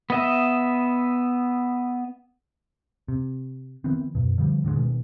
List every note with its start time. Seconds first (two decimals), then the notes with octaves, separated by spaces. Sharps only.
0.10 B3 D#5 E5
3.08 C3
3.84 D#3 E3 B3 C4
4.15 F#2 B2
4.38 D3 F3 G3
4.64 A2 D3 F3 G#3
4.76 B2 D#3 G#3